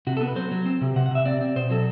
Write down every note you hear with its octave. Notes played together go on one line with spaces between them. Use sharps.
C3 F#4
A4
B3 B4
F#3 C5
F#3
C4
C3
C3 F#5
F#5
C3 E5
C4 D5
C4
B2 C5
F#3 A4